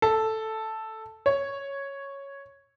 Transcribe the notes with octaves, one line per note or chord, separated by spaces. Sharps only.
A4
C#5